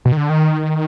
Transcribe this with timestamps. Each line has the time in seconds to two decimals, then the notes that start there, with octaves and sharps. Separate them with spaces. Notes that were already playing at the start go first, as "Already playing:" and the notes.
0.05 B2
0.12 D#3
0.17 D3
0.30 D#3